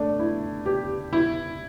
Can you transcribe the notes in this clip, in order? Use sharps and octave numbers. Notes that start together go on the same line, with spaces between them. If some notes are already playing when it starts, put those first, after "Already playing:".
Already playing: A3 D4
E4
G4
E4